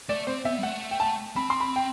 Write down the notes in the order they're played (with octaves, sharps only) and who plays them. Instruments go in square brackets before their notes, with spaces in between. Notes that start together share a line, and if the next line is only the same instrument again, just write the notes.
[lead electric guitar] A3 [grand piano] D5
[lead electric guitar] C4 [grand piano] C5
[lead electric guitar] B3 [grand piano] E5
[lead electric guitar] G3
[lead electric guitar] A3 [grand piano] F#5
[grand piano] G5
A5
[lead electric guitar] C4 [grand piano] B5
[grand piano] C6
B5
G5